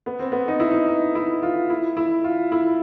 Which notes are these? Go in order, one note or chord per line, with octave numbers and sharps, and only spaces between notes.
B3
C4
B3
D#4
E4
D#4
D#4
E4
F4
E4
E4
F4
E4